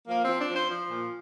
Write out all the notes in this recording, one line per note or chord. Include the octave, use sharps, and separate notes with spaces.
F3 A#3
C4
F3
D4
F3
C5
F3
A#2